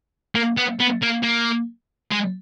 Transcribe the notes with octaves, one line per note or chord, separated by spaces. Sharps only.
A#3
B3
B3
A#3
A#3
G#3